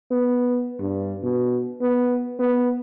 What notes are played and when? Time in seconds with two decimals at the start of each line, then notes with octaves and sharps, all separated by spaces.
0.11 B3
0.80 G2
1.23 B2
1.81 B3
2.39 B3